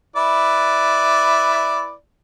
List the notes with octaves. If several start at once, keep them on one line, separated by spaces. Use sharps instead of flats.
E4 B4 D5